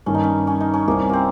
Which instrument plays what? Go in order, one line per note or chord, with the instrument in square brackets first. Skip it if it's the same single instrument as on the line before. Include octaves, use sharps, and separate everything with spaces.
[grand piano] G2 D#3 A#3 [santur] C#4
[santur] D#4
C#4
C#4
D#4
C#4
[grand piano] C2 C3 G3 [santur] A#3
[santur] A#3 C4